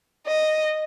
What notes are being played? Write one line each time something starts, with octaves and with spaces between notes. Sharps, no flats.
D#5